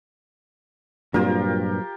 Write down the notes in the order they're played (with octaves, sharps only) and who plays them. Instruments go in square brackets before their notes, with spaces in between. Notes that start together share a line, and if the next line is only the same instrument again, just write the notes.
[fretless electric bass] G2 A#2 [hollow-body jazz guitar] F#3 A#3 C4 [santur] F4 G4 A#4